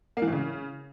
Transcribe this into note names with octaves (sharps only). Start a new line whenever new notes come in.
A#3
E3
A2
C#3